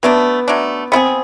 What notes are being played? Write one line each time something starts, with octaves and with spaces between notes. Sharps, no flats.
F#3 A3 B3 D4
F#3 A3 D4
B3 C4 E4 G#4